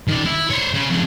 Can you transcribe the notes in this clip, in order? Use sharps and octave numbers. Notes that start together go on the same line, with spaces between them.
D#3 D5
E4
C5 C#5
C#3
F2 C#3